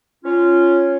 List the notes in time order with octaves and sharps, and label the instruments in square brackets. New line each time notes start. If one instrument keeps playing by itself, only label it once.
[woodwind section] C#4 F4